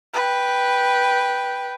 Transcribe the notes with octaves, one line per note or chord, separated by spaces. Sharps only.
B4 G5